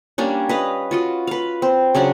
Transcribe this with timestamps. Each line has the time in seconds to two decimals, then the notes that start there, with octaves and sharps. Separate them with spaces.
0.18 G3 A#3 C#4 D4
0.49 B4 D#5 F5
0.91 F4 F#4 D#5
1.27 B4 F5
1.62 C4
1.95 C#3 F#3 C#4 D4